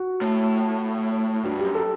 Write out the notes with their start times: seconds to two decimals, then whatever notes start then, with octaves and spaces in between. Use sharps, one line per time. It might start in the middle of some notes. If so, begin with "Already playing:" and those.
Already playing: F#4
0.22 A2
1.44 G2 F#4
1.59 G4
1.64 F#2
1.75 A4